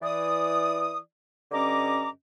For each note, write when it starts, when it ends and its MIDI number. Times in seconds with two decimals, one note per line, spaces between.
0.02 0.97 52
0.02 0.97 74
0.02 0.97 87
1.51 2.08 43
1.51 2.08 50
1.51 2.08 61
1.51 2.08 75
1.51 2.08 82
1.51 2.08 86